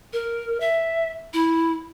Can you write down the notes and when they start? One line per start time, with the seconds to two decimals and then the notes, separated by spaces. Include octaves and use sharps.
0.13 A#4
0.60 E5
1.34 E4